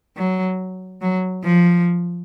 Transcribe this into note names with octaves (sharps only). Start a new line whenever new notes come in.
F#3
F#3
F3